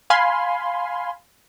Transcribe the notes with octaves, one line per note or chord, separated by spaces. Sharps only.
F5 G#5 B5 C6